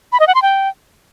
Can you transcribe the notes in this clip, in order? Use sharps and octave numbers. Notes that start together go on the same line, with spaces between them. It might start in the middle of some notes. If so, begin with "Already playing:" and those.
B5
D#5
F#5
C6
G5